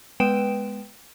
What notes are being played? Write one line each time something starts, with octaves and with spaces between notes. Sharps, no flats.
G#3 B3 B4 G5 D7 E7